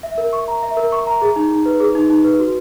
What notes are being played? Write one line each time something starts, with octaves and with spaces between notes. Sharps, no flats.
E5
A#4
C#6
A#5
E5
A#4
C#6
A#5
G#4
D#4
D#4
B4
G#4
D#4
D#4
B4
F#4